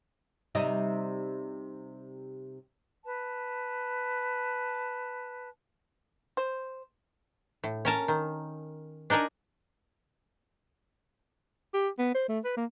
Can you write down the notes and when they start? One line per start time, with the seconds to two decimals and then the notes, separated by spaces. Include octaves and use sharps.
0.55 C3 G3 D#4
3.05 B4 A5
6.37 C5
7.64 A2
7.85 C#4 A#4 A5
8.08 D#3
9.10 D4 D#4 A#4 D5 G#5
11.74 G4
11.98 B3
12.15 C5
12.29 A3
12.44 B4
12.57 A#3